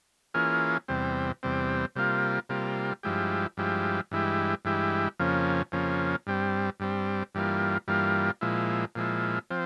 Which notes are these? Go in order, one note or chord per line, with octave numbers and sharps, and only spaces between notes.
E3 A#3 C#4 F4 G#4
E2 C3 G3 C4
E2 C3 G3 C4
C3 G3 A#3 F4
C3 G3 A#3 F4
G2 F3 G#3 E4 G4
G2 F3 G#3 E4 G4
G2 E3 G#3 E4 G4
G2 E3 G#3 E4 G4
F2 C#3 F3 A#3 C#4
F2 C#3 F3 A#3 C#4
G2 G3 C4
G2 G3 C4
G2 E3 G3 A#3 F4
G2 E3 G3 A#3 F4
A#2 F3 G#3 E4
A#2 F3 G#3 E4
F3 C4